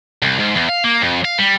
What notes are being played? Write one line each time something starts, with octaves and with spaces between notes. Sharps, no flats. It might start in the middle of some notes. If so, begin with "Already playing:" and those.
C2
G#2
E2
F5
A#3
F2
F5
G3